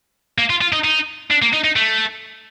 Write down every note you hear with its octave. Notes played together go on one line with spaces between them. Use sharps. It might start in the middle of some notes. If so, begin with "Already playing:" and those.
A#3
F4
F4
D#4
D#4
D4
A#3
D#4
D#4
A3